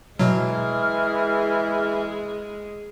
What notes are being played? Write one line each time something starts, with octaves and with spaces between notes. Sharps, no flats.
B2 E3 F#3 G#3 G#4 F6